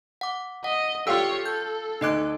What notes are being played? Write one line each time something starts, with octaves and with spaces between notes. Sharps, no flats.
F#5 D6
D#5 F#5
F4 G4 A4 C#5 F5 G5 E6
A4 G6
D2 D#4 D#5 D6 F#6 D7